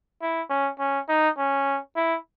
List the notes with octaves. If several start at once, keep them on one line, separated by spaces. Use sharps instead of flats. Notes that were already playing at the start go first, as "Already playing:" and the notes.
E4
C#4
C#4
D#4
C#4
E4